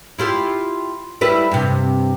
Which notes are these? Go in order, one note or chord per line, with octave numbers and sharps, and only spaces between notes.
E4 F4 G4
G3 E4 B4
G2 C3